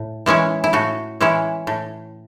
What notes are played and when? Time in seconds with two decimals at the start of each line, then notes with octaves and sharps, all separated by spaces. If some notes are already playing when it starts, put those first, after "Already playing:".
Already playing: A2
0.26 E3 G#3 C#4 E4
0.64 E4
0.73 A2 F#4
1.20 E3 G#3 C#4 E4
1.67 A2